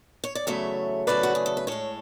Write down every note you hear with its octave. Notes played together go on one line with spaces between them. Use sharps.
C#5
D5
E2 C#3 F#3 A3 C#5 E5
E2 C#3 F#3 A3 B4 D5
F#4
G#4
A4
B4
A2 G#3 A4 C#5